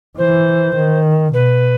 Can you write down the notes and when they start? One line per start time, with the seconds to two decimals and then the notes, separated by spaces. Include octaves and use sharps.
0.18 E3 C5
0.76 D#3
1.34 B2 B4